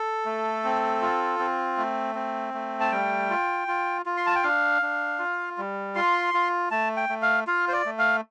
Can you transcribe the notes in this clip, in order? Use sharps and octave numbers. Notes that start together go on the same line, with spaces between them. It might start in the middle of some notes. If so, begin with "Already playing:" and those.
Already playing: A4
A3
C4
F4
C4
A3
C4
A3
A5
G3 G5
F4
F4
F4
C6
A5
G5
D4 F5
D4
F4
G3
F4 C6
F4
A3 A5
G5
A3
F5
F4 F5
C5
D5
A3
F5